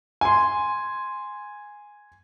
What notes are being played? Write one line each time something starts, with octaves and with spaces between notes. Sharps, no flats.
G#5 C6